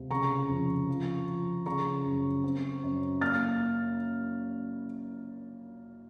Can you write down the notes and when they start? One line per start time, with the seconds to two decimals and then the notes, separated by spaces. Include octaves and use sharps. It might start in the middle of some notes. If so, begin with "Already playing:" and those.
Already playing: C#2 C3
0.10 C#3 A#5 C#6
0.49 F2
0.88 F3
1.27 F3
1.66 C#3 A#5 C#6
2.05 F#2
2.44 C4
2.83 F#2
3.21 A#3 F6 A6